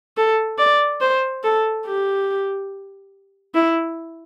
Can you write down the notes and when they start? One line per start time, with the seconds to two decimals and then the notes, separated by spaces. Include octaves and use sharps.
0.17 A4
0.58 D5
1.01 C5
1.43 A4
1.86 G4
3.55 E4